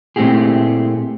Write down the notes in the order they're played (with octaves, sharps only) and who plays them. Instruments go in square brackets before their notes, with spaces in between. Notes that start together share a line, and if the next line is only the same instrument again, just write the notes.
[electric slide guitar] A#2 A3 C4 E4 G4 G#4